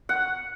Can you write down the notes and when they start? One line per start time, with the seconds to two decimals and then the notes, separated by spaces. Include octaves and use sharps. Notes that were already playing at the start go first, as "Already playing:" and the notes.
0.09 F#5